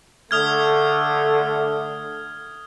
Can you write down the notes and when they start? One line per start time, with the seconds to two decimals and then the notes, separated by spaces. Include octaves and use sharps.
0.31 D3 A3 D#6 F6 G#6